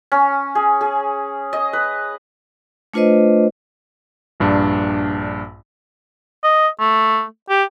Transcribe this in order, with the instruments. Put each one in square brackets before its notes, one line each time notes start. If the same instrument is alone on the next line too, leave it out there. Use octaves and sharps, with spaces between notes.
[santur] C#4
G#4
G#4
D#5
B4
[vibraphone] A3 D4 F4 B4 C5 D#5
[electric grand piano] A#1 G2 D4
[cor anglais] D#5
A3
G4